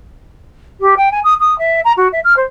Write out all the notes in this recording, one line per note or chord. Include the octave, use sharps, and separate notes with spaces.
G4
G5
G#5
D#6
D#6
E5
A#5
F#4
E5
F6
C5